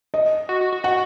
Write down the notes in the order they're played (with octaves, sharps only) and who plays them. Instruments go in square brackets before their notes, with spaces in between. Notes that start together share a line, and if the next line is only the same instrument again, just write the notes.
[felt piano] D#5
[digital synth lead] F#4
F#4
F#4
[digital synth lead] F#4 [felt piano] F#5